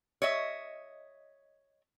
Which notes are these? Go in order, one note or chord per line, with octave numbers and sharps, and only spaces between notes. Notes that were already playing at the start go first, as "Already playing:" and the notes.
C#5 D#5 E5